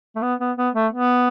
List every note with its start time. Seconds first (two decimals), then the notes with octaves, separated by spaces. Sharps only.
0.16 A3
0.22 B3
0.40 B3
0.57 B3
0.75 A3
0.92 B3